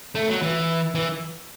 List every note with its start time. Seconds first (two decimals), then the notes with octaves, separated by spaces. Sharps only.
0.15 A3
0.28 F#3
0.42 E3
0.95 E3